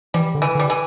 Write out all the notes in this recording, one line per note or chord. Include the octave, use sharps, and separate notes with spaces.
E3 G3
D3
E3
D3
G3
E3